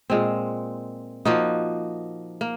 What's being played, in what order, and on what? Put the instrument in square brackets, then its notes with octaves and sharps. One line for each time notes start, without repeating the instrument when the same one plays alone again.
[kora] A#2 G#3 C4
F3 A#3 D#4 F#4
A#3